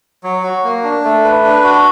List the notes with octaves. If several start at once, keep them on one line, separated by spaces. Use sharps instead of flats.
F#3
F#4
A#3
D4
A3
B4
D4
F#4